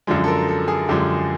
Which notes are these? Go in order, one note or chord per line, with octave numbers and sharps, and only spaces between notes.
F#2 D3 F3 G#3
A4
A#4
A4
G#4
F#2 D3 F3 G#3 G4